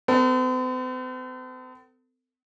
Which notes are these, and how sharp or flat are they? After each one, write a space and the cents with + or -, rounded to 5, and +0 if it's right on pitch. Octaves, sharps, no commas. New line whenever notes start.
C4 -45 A4 +35